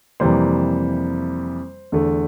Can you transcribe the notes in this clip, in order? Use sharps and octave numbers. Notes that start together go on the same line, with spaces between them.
F2 C3 E3 G3 A#3 C5
E2 D3 A3